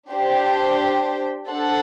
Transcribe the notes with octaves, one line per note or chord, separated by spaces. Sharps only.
D4 G4 C5 G5
D4 A4 C5 F#5